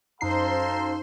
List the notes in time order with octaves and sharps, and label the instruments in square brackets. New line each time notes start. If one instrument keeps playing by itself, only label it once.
[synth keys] F#2 D#4 C7 [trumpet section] A4 F5 A#5 [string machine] C5 C6